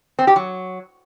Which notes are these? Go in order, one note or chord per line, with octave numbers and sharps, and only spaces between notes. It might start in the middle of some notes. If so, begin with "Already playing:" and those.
C4
G4
F#3